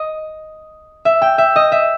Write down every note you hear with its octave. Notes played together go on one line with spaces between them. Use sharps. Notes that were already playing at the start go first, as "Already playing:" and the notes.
Already playing: D#5
E5
G5
E5
D#5
E5